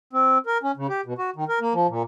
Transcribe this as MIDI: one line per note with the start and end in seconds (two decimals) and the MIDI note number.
0.13 0.38 60
0.46 0.58 70
0.63 0.72 61
0.77 0.87 49
0.89 1.01 67
1.06 1.14 47
1.18 1.30 66
1.36 1.44 51
1.49 1.59 70
1.61 1.73 58
1.73 1.87 53
1.88 2.03 46